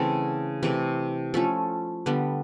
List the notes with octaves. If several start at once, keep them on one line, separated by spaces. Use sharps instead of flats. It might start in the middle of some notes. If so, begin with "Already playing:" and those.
Already playing: C#3 E3 A3 C4 A4
C3 E3 A3
F3 A3 C#4 A4
D3 G3 B3